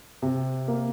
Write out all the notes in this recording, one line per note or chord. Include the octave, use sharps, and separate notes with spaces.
C3
A#3